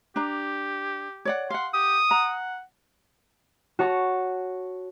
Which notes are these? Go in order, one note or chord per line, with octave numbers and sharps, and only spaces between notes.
D4 G4 A#5
C#5 D5 F#5
F5 F#5 C6
G4 D#6
F#5 A#5
F#4 C#5 A5 C#6